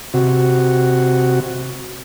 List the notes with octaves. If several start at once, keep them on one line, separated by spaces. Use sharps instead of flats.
C3 F#4